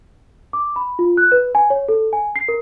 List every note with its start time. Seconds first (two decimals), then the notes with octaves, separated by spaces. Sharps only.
0.53 D6
0.76 B5
0.99 F4
1.17 F#6
1.32 B4
1.55 G#5
1.70 C#5
1.89 A4
2.13 G#5
2.36 C7
2.48 A#4